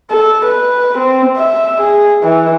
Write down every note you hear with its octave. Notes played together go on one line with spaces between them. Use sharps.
A4
B4
C4
E5
G#4
E3